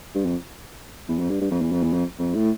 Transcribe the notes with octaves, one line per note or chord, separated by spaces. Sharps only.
G2
F2
E2
F2
G2
G2
F2
E2
F2
E2
F2
F2
A2